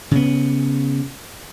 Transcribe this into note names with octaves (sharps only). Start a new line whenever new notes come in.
C#3 B3